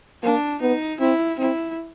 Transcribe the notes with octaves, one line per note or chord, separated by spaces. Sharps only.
A#3 D4
B3 D#4
C4 E4
C4 E4